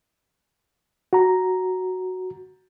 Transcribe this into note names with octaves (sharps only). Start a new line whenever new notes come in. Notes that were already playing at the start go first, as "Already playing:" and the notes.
F#4 A#5